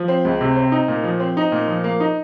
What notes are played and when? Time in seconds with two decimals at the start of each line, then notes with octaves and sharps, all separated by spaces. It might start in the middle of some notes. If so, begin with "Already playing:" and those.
Already playing: F3
0.08 C4
0.25 C#2
0.41 C3
0.56 C4
0.72 D#4
0.88 A#2
1.04 F3
1.20 C4
1.37 D#4
1.52 A#2
1.68 F3
1.84 A#3
2.00 D#4